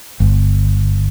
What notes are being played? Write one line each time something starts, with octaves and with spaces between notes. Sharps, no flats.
G1